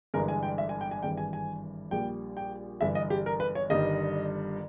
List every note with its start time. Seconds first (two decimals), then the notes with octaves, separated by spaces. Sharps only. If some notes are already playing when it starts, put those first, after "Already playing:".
0.14 G1 G2 E3 G#3 A#4
0.28 G#5
0.43 G5
0.58 E5
0.69 G#5
0.81 G5
0.91 G#5
1.03 G#1 G2 E3 G5
1.17 G#5
1.33 G#5
1.91 A#1 A#2 G3 G5
2.37 G5
2.81 G1 G2 E3 E5
2.95 D#5
3.10 G4
3.26 A#4
3.40 B4
3.55 C#5
3.70 G1 G2 D#3 G3 D#5